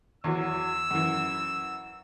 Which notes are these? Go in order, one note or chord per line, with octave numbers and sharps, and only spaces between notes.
E2 E3 F#3 E6
F#2 E3